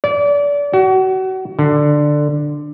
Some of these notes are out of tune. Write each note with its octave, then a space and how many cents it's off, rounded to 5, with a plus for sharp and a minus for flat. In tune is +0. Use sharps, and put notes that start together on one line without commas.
D5 -30
F#4 +30
D3 +10